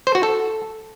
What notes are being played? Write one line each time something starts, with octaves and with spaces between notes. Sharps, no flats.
C5
F#4
A4